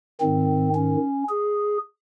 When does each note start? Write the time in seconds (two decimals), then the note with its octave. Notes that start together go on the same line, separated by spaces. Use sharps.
0.21 G#2 D#3 C4
0.75 C#4
1.29 G#4